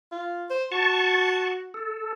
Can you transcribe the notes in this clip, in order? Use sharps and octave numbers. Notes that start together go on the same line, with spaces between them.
F4
C5
F#4 A5 C#6
A4